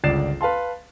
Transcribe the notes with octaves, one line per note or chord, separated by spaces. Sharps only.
G1 C#2 D5 A6 C7 E7
B4 F5 A5 C6